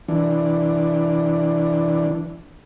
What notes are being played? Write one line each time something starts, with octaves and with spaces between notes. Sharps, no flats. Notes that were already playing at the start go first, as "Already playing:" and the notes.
E3 D4